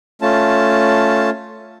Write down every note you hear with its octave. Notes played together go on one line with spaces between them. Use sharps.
A3 C#4 F4 A5